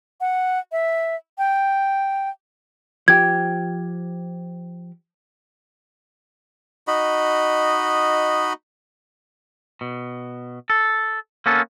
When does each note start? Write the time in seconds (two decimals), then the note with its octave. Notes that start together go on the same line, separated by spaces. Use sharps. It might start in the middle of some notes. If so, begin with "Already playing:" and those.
0.21 F#5
0.72 E5
1.38 G5
3.08 F3 G4 G#6
6.87 D#4 F#4 D#5 B5
9.81 B2
10.70 A4
11.46 A#3 B3 C#4 A4